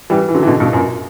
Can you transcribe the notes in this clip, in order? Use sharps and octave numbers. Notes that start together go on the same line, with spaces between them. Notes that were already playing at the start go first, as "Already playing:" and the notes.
E3 G3
E3
D3 F#3
E3
B2 D3
G2 B2
F#2 A#2